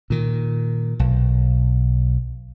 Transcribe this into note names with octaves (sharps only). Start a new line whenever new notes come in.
A#2 D#3
B1